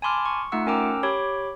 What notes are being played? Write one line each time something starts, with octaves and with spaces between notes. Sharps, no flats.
G#5 A5 B5 C6 D6 F6
C#6
A3 D#4 F4 F#5 E6
C#4 A#4 G5 A#5 D6 E6
G4 C#5 B5 D6